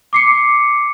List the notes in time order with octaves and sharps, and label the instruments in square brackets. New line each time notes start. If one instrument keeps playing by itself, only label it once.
[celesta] D6 C7 C#7